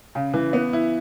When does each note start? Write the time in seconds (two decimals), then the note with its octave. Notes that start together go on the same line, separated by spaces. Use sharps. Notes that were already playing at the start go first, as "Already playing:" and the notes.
0.15 C#3
0.34 E3
0.53 B3
0.73 E4